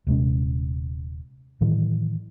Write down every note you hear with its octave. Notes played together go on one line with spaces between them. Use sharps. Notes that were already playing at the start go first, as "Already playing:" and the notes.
D#1 C3 G#3 C#4
A2 D#3 E3 F#3